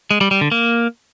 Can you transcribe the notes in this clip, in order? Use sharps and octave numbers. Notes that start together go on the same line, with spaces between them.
G#3
G3
G3
D3
A#3